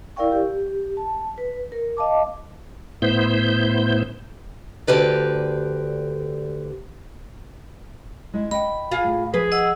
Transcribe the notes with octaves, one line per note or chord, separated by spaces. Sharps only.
E4 A#4 D5 F5 G5 C#6
G4
A5
B4
A#4
D#5 F5 A5 D6
A2 B3 E4 C5 G6
D2 D3 G4 B4 D5
G#3 E4
D#5 F#5 G5 B5
F4 G#4
A2
F3 G#4 B4
D#5 F#5 E6